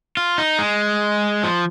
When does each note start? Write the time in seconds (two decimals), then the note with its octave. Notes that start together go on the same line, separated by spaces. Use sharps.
0.17 F4
0.38 D#4
0.59 G#3
1.43 F3